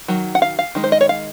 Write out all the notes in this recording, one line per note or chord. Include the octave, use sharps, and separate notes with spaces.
D#3 F#3
F#5
F5
F5
D#3 G#3
C5
D#5
C#5
F5